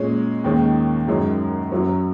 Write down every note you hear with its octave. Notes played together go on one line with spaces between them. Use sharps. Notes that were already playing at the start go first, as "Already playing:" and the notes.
Already playing: A#2 G#3 C#4
D#2 D#3 G#3 C#4
F#2 D#3 G#3 C#4
F#2 F#3 C#4